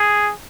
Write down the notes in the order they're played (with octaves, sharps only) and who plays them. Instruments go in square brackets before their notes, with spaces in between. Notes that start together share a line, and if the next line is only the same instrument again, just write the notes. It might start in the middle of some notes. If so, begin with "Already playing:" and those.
Already playing: [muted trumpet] G#4